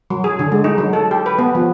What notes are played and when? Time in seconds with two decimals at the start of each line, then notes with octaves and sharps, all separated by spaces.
0.10 F#3
0.24 G#4
0.39 D3
0.52 G#3
0.64 D#4
0.78 F#3
0.93 A4
1.11 G4
1.26 B4
1.39 B3
1.55 F3